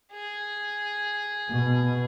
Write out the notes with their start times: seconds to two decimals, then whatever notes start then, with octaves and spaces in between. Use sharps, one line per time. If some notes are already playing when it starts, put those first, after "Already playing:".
0.12 G#4
1.50 B2